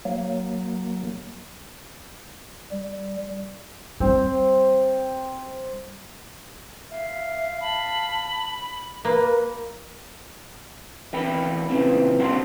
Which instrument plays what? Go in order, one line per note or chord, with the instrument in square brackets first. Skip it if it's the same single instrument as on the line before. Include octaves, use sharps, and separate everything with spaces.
[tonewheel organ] F#3 A#3
[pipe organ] G3
[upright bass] G3 [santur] C4
[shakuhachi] E5 [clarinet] F5
[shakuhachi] A5 [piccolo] B5
[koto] A#3 [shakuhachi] A#4 [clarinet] B4
[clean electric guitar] E2 A#4 G5 B5
A#2 C#3 E3 C4
A#3 C4 D4 F#4 C5